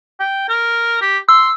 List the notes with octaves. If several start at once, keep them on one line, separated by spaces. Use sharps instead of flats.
G5
A#4
G4
C6 E6